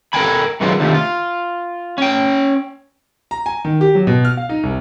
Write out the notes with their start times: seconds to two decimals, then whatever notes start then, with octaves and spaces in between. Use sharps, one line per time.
0.13 A4 A#4 D#5 G5 G#5 B5
0.61 D#3 E3 F#3 G#3 F4
0.80 D2 C3 D#3 F3 A3
0.95 F4
1.98 C#4 G5
3.31 A#5
3.46 G#5
3.65 D#3
3.81 G4
3.95 F#3
4.07 B2
4.25 F6
4.37 F5
4.49 D#4
4.63 C2